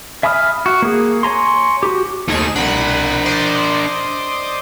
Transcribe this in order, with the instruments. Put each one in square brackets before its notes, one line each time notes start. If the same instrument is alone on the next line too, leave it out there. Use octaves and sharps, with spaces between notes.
[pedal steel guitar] E5 G#5 B5 D#6 F6
F#4
A#3 G#4
C#5 G#5 A#5 C6
F#4 G4
[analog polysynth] D#2 G#4 E7 [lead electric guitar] A3 D#4
[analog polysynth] C2 F#5 B5 [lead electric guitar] D4 A#4
[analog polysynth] C5 D5 D#5